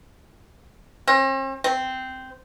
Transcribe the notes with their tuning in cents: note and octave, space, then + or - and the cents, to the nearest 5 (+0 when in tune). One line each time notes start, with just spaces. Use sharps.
C4 +45
C4 -10